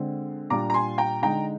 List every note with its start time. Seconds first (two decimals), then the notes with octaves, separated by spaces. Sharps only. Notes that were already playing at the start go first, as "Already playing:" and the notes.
Already playing: D3 G#3 C4
0.50 A#2 G3 D4 F4 A#5 D6
0.70 A#5
0.74 G#5 C6
0.98 G5 A#5
1.22 D3 G#3 D#4 G5 A#5